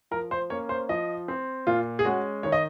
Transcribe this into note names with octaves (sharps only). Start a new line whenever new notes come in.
F3 A#4
C5
A#3 C#4 C#5
C5
F3 D#5
C4
A#2 F4
G#4
G#3 C#4 F#4
D#3 C#5
D#5